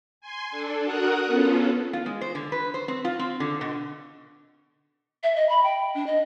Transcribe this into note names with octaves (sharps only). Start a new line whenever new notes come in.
G#5 C6
D4 A4
F#4 A#4 F#5 A#5 D#6 F#6
B3 C#4 F4 A4
F4
G#3
C5
D3
B4
C5
C4
F4
C4
D3
B2
E5
D#5
B5
G5
D4
D#5